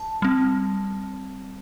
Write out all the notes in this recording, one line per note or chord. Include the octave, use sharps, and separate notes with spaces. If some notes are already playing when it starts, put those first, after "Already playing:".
Already playing: A5
G3 C4